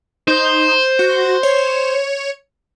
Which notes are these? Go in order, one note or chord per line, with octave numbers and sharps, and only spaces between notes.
D#4 C5
F#4
C#5